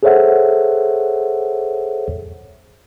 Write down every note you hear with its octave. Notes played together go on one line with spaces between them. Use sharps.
G#4 A4 C5 C#5 E5 F#5